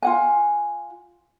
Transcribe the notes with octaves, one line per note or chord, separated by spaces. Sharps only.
F4 F#5 G#5